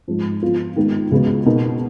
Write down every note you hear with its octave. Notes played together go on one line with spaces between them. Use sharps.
G#2 F3 G#3
F3 B3 F4
D#3 G#3 B3 D#4
C#2 C#3 G#3 B3 F#4
B2 A#3 D#4 A#4